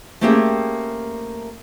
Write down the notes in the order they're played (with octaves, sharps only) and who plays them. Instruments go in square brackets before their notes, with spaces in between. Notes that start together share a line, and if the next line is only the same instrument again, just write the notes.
[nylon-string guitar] A3 A#3 C4 C#4 G4 G#4